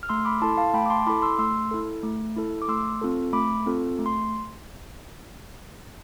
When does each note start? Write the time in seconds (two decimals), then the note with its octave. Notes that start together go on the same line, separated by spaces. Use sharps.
0.03 F6
0.09 A3 C6 E6
0.25 B5 D6
0.42 E4 A4 A5 C6
0.57 F5 A5
0.73 A3 G5 B5
0.86 D6
0.90 A5 C6
1.07 E4 A4 B5 D6
1.22 C6 E6
1.39 A3 C6 E6
1.71 E4 A4
2.03 A3
2.36 E4 A4
2.62 D6
2.68 A3 C6 E6
3.01 C4 F4 A4
3.33 A3 B5 D6
3.66 C4 F4 A4
3.99 A3
4.06 C6